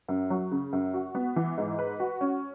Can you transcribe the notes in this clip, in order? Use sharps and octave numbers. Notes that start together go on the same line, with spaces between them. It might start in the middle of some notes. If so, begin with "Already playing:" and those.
F#2
F#3
C#3
F#2
F#4
B3
E3
G#2
B4
F#4
C#4